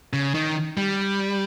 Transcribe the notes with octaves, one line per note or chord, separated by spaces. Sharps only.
C#3
D#3
G3